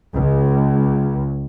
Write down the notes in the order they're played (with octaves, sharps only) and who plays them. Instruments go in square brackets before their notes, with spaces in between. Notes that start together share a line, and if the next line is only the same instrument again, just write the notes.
[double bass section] C#2